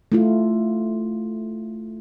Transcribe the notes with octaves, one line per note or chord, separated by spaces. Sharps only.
A3 E4 F4